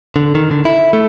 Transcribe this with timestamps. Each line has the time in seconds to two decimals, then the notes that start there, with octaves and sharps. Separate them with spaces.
0.16 D3
0.35 D#3
0.51 D3
0.65 E4
0.93 A3